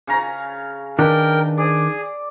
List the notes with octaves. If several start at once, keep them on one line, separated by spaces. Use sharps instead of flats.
C#3 C#4 A#5
D#3 D4 A#4 B4 G5
G#4 D5